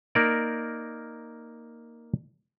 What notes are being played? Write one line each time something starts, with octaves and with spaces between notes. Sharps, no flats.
A#3 D#4 A#4 D5